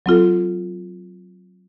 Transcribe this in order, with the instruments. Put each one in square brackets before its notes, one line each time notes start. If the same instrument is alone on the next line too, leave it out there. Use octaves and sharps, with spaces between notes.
[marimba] F#3 C4 F4 A4